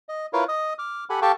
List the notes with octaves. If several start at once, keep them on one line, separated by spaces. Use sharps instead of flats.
D#5
E4 F4 A#4 B4 C#5 F5
D#5 D#6
D6 F6
G4 A4 F#5 G#5 B5
G4 A4 F5 G5 A5 C#6